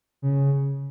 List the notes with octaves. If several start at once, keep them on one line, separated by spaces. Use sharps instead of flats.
C#3